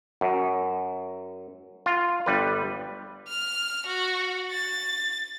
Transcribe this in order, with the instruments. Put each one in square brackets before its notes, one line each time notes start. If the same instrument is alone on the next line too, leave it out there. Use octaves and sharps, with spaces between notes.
[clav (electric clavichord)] F#2
F4
G1 G3 B4
[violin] F6
F#4
A6